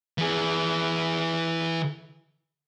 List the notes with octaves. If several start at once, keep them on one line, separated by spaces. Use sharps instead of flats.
E3 G#4